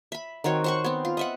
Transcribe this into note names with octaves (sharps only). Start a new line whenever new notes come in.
E5 B5
D#3 C4 F#4 C#5
C5 F#5 C#6
B3 C4
F4
D#5 E5 F#5